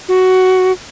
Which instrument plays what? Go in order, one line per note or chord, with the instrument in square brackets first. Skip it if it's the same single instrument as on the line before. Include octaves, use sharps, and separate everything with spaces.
[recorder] F#4